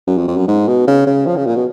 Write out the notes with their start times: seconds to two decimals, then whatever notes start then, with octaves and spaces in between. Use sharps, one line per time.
0.07 F#2
0.18 F2
0.28 F2
0.37 F#2
0.48 G#2
0.68 B2
0.87 C#3
1.07 C#3
1.26 F3
1.37 C#3
1.47 A#2
1.56 B2